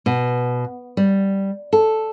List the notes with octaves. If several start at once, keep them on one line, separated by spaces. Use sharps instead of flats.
B2
G3
A4